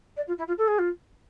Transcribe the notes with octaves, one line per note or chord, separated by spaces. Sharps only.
D5
F4
E4
F4
A4
G#4
F4